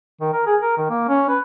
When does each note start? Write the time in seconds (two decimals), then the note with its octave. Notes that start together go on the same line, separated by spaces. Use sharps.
0.21 D#3
0.33 A#4
0.46 G#4
0.61 A#4
0.77 D#3
0.89 A#3
1.08 C#4
1.29 B4